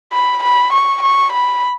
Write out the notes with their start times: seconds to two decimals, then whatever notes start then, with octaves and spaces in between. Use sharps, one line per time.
0.13 B5
0.43 B5
0.73 C#6
1.03 C#6
1.32 B5